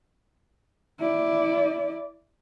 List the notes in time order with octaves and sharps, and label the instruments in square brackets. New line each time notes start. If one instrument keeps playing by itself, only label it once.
[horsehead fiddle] E4 D5